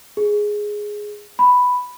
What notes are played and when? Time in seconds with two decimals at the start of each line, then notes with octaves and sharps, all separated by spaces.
0.17 G#4
1.39 B5